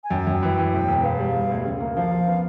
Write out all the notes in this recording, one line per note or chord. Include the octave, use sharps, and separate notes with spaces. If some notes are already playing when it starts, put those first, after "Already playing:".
G#5
F#2 G5
F#2
E3
E3
E1 G5
E1
B3 F5
G3
G3
D2
C#3
A#3
F3 F5
F3
B3